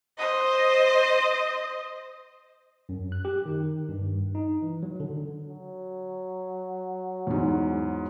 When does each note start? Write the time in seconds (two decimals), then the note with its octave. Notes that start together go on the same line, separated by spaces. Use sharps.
0.18 C5 D#5
2.89 F#2
3.12 F#6
3.25 G4
3.46 D#3
3.89 G2
4.35 D#4
4.62 E3
4.83 F#3
5.00 D3
5.50 F#3
7.27 E2 G#2